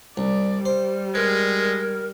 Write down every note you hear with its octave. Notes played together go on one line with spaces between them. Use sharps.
C2 D5
G3 C5
G#3 A#4 B4